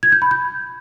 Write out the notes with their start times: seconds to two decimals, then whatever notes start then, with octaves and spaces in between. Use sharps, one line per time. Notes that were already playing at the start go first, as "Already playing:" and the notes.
0.03 G#6
0.12 G6
0.22 B5
0.31 G6